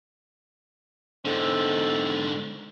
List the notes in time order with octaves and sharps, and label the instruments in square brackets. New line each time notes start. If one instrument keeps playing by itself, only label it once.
[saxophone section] E2 C4 A4 [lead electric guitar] G#2 D3